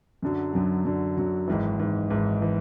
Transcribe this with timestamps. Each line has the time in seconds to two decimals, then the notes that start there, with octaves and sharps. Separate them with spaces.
0.22 F#2 D3 F#3
0.54 F#2 D3 F#3
0.85 F#2 D3 F#3
1.17 F#2 D3 F#3
1.48 G#1 G#2 E3
1.79 G#1 G#2 E3
2.10 G#1 G#2 E3
2.42 E3